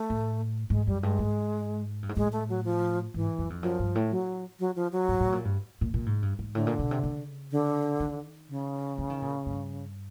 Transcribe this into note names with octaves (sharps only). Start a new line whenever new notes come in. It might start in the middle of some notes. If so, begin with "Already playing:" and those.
Already playing: A3
A2
G#2 G#3
F#2 G3
G2 G#3
G#2
G2
G#2
A2 G#3
A3
F#3
F3
G#2 E3
F#2
F2
F#2 F3
G2
A2
F#3
F#3
F3
F#3
G#2
A2
A#2
G2
A#2
A#2
G#2
G2
G#2
A2 D3
A#2
B2
C3
C#3
D3
D#3
C#3
E3
D#3
A#2
G2